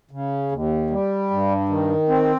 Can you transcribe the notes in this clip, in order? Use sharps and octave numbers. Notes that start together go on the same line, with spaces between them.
C#3
D#2
G3
G2
D#3
C4